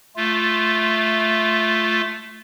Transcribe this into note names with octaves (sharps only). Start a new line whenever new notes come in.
A3 F4